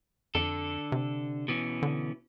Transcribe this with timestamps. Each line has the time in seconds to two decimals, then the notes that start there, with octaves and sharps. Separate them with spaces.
0.35 F2 D3 A4
0.92 C3
1.48 B2 E3 C#4
1.83 D3